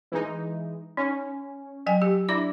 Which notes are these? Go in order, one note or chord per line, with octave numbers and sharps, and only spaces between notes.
E3 G#3 D#4
C#4 D#4
F#3 G5 G#5
G4
D4 E4 D5 D6